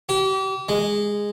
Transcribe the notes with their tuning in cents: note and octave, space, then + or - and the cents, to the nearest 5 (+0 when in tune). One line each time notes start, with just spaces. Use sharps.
G4 -35
G#3 -10